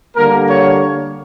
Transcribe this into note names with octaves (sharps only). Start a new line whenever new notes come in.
D3 G3 A#3 A#4
C#5